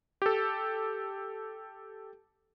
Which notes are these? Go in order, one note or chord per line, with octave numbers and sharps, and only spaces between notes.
G4 A4